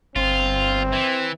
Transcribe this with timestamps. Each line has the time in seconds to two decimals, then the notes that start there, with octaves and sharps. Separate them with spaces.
0.16 G1 C4 F4
0.93 E3